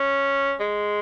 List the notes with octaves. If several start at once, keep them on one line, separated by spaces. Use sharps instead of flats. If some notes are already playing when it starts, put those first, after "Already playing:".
Already playing: C#4
G#3